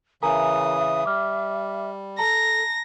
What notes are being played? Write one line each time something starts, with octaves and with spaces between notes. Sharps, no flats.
C#3 E3 A#4 E5 G#5 A#5 D#6
G3 D6 F6
A4 A5 A#5 A#6